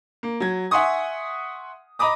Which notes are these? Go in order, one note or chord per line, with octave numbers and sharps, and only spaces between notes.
A#3
F#3 G#6
E5 F#5 G#5 C6 C#6 D#6
D#5 A#5 B5 D6 D#6